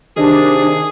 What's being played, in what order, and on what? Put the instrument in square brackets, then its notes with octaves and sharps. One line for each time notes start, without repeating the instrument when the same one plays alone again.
[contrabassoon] C3 [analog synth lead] D#3 [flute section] D4 [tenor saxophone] G#4